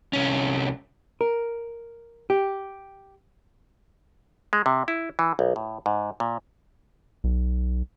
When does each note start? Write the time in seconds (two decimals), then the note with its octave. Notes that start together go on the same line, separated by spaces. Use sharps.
0.13 C2 C#4
1.21 A#4
2.30 G4
4.53 G#3
4.66 C3
4.88 E4
5.19 E3
5.39 B1
5.56 A2
5.86 G#2
6.20 A#2
7.24 B1